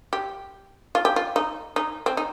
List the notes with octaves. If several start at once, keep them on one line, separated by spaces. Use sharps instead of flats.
G4
F4
G4
F4
D#4
D#4
C4
D#4